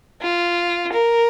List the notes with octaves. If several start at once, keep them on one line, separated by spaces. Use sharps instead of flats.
F4
A#4